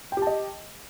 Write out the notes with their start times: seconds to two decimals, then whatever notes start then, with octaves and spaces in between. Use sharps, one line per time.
0.12 G5
0.17 G4
0.22 A5
0.27 D#5